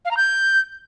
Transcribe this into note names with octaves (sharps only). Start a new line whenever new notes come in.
F5
A#5
G6